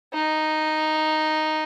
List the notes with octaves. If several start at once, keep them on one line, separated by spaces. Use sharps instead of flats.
D#4